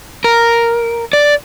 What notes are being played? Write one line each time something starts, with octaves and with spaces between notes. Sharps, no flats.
A#4
D5